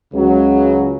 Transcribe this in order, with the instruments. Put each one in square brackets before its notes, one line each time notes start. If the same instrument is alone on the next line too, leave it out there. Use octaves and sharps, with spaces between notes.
[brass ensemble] C#2 C#3 F#3